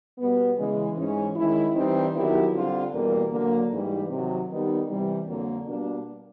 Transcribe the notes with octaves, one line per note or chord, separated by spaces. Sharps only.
B2 G3 B3
C#3 E3 G#3
G#2 E3 G#3 C#4
D#3 G#3 C#4 E4
E3 G3 C4 D#4
D#3 F#3 B3 E4 G4
D3 G3 C4 F4
E2 B2 G3 A#3
D3 F#3 A#3
G#2 E3 G3
C3 D#3 F#3
D#3 G3 B3 D#4 G4
C3 E3 G3
F2 D3 F#3 A#3
B2 G3 A#3 D4